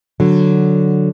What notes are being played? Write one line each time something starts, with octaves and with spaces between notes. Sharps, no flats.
D3 F#3